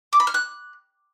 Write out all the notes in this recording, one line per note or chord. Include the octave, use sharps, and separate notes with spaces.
D6
B5
F6
F#6